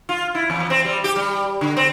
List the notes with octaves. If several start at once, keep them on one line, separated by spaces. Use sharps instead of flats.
F4
E4
E2
C4
G3
G4
G3
D3
C4